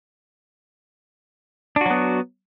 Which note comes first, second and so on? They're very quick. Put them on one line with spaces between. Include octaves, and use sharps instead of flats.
D4 F#4 F#3 B3